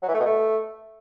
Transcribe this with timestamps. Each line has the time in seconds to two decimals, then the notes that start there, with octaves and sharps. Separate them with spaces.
0.03 F#3
0.08 E3
0.14 A3
0.20 B2
0.26 A3